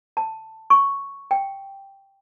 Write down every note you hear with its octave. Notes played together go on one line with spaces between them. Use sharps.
A5
C#6
G5